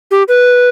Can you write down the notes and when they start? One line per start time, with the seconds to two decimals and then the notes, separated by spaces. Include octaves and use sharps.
0.11 G4
0.28 B4